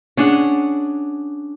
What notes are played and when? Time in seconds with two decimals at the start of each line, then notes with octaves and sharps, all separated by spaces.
0.17 C#4 D4 G#4 F#5